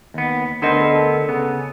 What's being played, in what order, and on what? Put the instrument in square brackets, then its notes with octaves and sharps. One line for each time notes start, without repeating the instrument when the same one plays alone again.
[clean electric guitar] D#2 B3
[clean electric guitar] D2 B3 C5 [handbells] D4 A#4 D#5
[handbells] A4
[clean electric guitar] C#3 B3